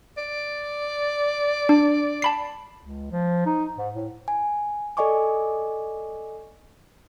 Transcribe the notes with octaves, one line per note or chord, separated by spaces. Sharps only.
D5
D4
A5 B5 C7
C#2
F3
D#4
G#2
A2
G#5
A4 D5 D#5 G#5 C#6 D6